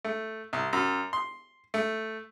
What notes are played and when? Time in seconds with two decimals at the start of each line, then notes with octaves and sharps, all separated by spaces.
0.04 A3
0.53 C2
0.73 F#2
1.13 C6
1.74 A3